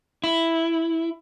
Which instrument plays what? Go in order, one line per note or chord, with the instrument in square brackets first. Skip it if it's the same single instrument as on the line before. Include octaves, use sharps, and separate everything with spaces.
[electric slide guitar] E4